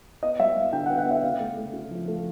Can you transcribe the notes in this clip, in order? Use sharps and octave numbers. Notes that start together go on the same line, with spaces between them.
B3 D#5
G3 E5
G3 F5
D3 G5
F#5
B3
F#5
B3 E5
C#3 F5
A3
A3
C#3
F3
A3